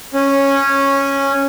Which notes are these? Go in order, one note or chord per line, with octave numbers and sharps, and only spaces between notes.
C#4